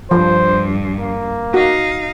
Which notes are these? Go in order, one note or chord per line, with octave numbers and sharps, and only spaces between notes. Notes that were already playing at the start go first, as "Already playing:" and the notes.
G2 F3 C5
A#3
D#4 F#4 F5